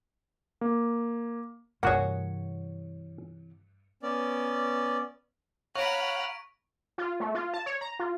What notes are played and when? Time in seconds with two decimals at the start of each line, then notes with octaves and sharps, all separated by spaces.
0.61 A#3
1.83 G2 C3 E3 A#3 F#4 G#4 C#5 F#5
4.03 B3 C#4 D5
5.75 C#5 F5 F#5 A#5 B5 C#6 D7
6.98 F4
7.20 A3
7.35 F4
7.54 A5
7.66 C#5
7.81 A#5
7.99 F4